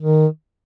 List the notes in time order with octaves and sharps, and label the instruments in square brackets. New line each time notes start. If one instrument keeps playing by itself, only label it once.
[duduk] D#3